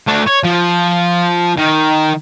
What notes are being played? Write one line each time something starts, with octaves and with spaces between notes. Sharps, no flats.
A3 D4
C#5
F3
D#3